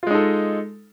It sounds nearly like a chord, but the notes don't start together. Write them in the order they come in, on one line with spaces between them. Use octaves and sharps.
F4 G#3 D#4 A4